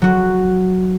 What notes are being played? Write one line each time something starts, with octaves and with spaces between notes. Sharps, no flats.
F#3 F#4